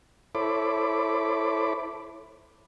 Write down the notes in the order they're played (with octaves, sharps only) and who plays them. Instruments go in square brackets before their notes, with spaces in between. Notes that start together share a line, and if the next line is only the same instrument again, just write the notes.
[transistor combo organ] E4 A4 C5 C#5 B5 D6